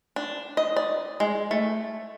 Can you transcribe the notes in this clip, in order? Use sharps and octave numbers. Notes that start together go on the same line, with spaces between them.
D4
D#5
D5
G#3
A3